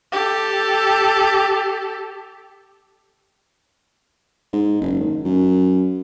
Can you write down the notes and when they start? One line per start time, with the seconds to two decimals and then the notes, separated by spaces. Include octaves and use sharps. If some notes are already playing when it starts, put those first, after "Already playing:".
0.12 G4 A4
4.53 G#2
4.81 F#1
5.01 D#3
5.25 F#2